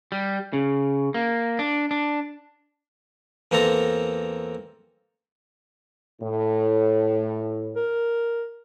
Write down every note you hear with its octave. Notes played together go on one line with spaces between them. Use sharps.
G3
C#3
A#3
D4
D4
E2 A#3 C4 A4 A#5
A2
A#4